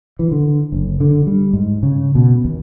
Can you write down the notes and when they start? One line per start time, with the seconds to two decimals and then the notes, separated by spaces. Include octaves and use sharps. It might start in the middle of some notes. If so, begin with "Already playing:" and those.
0.19 E3
0.31 D3
0.72 F#1
1.00 D3
1.27 G3
1.53 G#2
1.83 C#3
2.15 B2
2.45 D#2